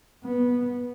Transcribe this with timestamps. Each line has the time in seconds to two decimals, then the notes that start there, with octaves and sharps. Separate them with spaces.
0.24 B3